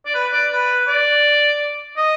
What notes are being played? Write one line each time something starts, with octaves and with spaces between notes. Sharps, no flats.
D5
B4
D5
B4
D5
D#5